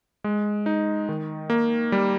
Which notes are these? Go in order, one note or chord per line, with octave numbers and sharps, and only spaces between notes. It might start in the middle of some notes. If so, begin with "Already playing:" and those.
G#3
D#4
D#3
A#3
G3